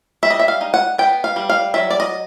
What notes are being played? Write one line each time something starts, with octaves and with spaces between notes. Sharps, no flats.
G3 E5
D#5
E5
F5
D#4
F#5
B3 G5
F5
G3
F5
F#3 E5
D5
D#5